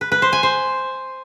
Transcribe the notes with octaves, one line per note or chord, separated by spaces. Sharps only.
B4
B4
C5
G#5
C5